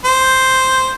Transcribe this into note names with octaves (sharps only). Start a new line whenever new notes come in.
C5